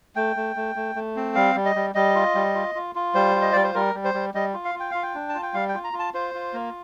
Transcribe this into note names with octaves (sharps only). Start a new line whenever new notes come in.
A3 G5
A3
A3
A3
A3
C4
G3 F5
G3
D#5
G3
G3 D#5
F4
G3
F4
F4
F4
G3 C5
F4
D#5
G3 D5
C5
G3 A#4
G3
C5
G3
G3 D#5
F4
F5
F4
G5
F4 F5
G5
D4
A5
F4
G5
G3 F5
G5
F4
A#5
F4
A5
F4 C5
F4
A#3